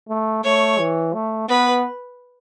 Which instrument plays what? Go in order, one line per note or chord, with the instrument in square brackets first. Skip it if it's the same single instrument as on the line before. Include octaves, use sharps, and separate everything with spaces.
[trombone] A3
[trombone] A3 [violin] C#5
[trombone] E3
A3
[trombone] B3 [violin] B4